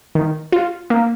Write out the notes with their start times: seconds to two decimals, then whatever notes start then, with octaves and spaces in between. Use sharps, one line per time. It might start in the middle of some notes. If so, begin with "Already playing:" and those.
0.15 D#3
0.52 F4
0.90 A#3